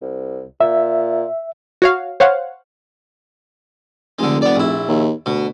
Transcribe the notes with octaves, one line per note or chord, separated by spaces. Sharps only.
C2
A#2 E5
F#4 C#5 F5
C5 C#5 F5 F#5
F1 D3 G#3
B3 D5
A#1 E4
D#2
D2 B2